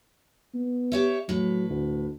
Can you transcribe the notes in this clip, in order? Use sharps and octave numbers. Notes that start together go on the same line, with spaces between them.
B3
G4 C#5 E5
A2 F#3 B4
D2